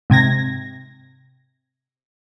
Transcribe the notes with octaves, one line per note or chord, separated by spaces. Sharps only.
G#2 C3 G#6 A#6